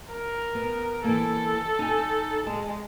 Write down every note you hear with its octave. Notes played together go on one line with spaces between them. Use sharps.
A#4
B3
E3 A#3 A4
D#4 G#5
G#3 A5